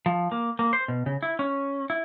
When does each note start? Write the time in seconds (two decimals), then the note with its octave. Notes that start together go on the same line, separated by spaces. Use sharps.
0.06 F3
0.32 A#3
0.59 A#3
0.73 C5
0.88 B2
1.06 C#3
1.23 E4
1.39 C#4
1.90 E4